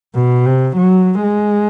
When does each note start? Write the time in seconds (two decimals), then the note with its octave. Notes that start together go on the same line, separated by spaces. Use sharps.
0.15 B2
0.46 C3
0.77 F#3
1.23 G#3